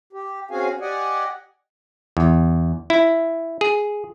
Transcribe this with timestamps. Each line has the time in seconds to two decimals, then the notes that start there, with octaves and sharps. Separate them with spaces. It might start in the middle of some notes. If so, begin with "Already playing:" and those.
0.13 G4
0.51 C4 C#4 F#4 G#4 F5 G#5
0.81 G4 D5 D#5 F#5 G#5
2.17 E2
2.90 E4
3.61 G#4